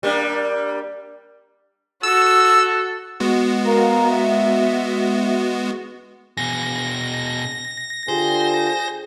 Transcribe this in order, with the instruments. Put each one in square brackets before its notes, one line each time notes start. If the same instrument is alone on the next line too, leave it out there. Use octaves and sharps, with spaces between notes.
[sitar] G3 A#3 D4
[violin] F#4 [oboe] A4 [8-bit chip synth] E6
[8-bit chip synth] G#3 B3 F#4
[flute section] A#4 F5 A#5
E5
[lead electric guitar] B2 G#4 [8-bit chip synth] A#6
[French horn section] D3 F4 G4 [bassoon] G#4 [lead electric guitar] C5